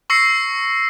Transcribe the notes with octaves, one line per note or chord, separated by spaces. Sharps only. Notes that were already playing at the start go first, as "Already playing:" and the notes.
C#6 E6 A#6 C7 C#7